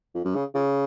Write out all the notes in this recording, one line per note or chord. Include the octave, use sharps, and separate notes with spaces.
F2
F#2
C#3
C#3